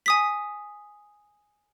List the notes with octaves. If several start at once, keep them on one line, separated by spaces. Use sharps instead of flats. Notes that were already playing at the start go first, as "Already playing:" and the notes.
G#5 D#6 B6